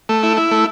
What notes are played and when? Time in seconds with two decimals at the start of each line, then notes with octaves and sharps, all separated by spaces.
0.09 A3
0.23 E4
0.37 E4
0.51 A3